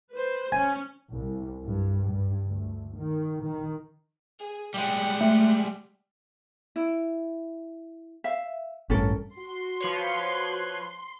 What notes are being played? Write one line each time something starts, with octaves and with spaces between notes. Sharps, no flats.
B4 C5
C#4 G#5
C2
G2
G2
D2
D#3
D#3
G#4
G3 G#3 G4 F#5
A3
E4
E5 F5
A1 G2 C#4 A4 A#4
F#4 C6
F3 B4 C#5